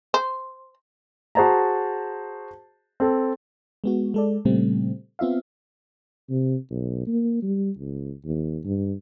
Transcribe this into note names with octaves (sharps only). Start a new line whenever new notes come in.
C5
F#4 G#4 C5 A5 A#5
C4 A4
G#3 B3 F#4
G#3 A4 D5
A#2 C#3 G3 A3 C4
B3 C4 F4 E5 F5
C3
B1
A#3
G3
C#2
D#2
G2